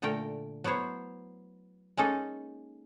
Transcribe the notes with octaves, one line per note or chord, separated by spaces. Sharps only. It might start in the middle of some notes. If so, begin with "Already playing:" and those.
A#2 D3 A3 A#4 G5
F#3 B3 E4 C5 C#5
G#3 A#3 C#4 D#4 A4